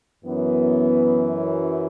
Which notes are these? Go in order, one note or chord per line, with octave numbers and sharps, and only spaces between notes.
F#2 E3 B3